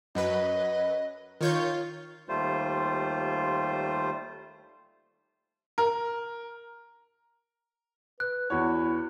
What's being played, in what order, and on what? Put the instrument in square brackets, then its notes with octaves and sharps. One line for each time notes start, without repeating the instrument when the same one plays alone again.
[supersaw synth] F#2 F#3 B4 [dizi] D#5
[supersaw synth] D#3 C#5 G6 [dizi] F4
[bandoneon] D#2 G3 A3 F4 C5
[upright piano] A#4
[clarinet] B4 [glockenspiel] F#6
[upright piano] E2 F#4 C#5 [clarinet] E4